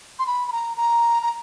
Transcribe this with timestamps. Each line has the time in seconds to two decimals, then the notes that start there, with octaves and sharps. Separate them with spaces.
0.19 C6
0.27 B5
0.48 B5
0.52 A#5
0.77 A#5
1.23 A#5